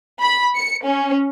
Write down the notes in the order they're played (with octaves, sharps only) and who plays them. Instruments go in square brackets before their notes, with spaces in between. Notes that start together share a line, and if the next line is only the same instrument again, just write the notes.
[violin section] B5
C#7
C#4